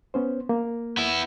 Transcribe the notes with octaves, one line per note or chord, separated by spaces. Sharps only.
B3 C#4 C5
A#3
B3 E4